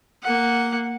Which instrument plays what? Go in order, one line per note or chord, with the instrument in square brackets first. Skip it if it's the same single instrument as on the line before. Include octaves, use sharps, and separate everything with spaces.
[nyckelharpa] A#3 F#5